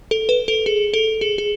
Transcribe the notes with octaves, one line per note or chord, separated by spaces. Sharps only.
A4
B4
A4
G#4
A4
G#4
G#4